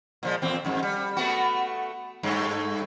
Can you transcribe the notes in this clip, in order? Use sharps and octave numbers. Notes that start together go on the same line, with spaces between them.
A#2 F3 G#3
E2 A#2 C4
F2 G#2
G3
A3 B3 F#4
G2 A3